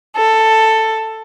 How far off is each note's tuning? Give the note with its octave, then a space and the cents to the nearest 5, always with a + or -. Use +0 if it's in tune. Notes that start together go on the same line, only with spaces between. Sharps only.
A4 +10